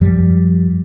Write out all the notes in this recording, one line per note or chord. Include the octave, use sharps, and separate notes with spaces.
F#2 F3 G3